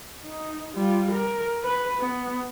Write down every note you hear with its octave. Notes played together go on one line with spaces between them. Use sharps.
D#4
G3 F4
A#4
B4
B3